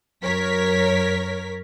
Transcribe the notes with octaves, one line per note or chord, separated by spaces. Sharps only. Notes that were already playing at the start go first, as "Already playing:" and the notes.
F#2 A#4 C#5 B6